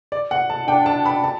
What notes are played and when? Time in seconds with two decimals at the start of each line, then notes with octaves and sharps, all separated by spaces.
0.12 D5
0.31 F#5
0.50 A5
0.68 D4 G5
0.86 A5
1.05 B5
1.24 A5